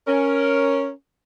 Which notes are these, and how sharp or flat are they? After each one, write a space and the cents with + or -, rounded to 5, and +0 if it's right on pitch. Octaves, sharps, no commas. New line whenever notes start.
C#4 +0 A#4 +0